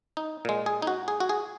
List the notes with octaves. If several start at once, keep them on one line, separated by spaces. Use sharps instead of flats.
D#4
A#2 G#3
G#4
D#4
F#4
G#4
F#4
G#4